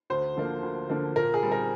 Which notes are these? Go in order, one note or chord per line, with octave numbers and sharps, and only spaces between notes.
D2 C5
D3 F3 A#3
D2
D3 F3 A#3
A#2 A#4
G#4
G3 C4
A#4